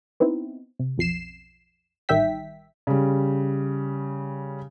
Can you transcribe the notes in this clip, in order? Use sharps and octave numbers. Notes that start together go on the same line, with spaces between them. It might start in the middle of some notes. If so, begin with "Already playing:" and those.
B3 C4 D#4 E4
C3
B1 F2 C7 E7
A1 D#3 G3 E5 G5 B6
C#3 G3